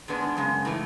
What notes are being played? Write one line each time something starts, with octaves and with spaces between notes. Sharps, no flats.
G#2 G#3 B3 D4
F#2 C#3 G#3
A2 E3 A3